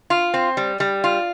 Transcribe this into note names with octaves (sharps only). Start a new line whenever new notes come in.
F4
C4
G3
G3
F4